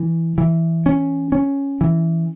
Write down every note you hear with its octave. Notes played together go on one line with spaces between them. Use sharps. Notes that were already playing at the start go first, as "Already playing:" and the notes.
Already playing: E3
E3
C#4
C#4
E3